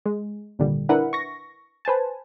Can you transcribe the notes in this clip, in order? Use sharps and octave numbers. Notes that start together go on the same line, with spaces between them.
G#3
G#1 A#2 D3 G3
D4 E4 A#4 B4 E5 F#5
C#6 A#6
B4 C5 G#5 A5